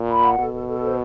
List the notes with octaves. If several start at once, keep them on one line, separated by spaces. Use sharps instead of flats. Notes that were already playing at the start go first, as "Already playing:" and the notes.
Already playing: A#2
B5
F#5
B2 A4
A4
A4
C5